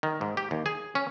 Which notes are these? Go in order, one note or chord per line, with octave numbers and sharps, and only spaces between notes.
D#3
G#2
G4
D#2
G#4
C#4